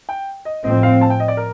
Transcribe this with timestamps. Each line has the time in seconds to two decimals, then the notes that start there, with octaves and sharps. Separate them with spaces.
0.09 G5
0.45 D#5
0.64 A2 F3 C4 D#5
0.83 F5
1.01 A5
1.10 G5
1.20 D#5
1.28 D5
1.37 A#4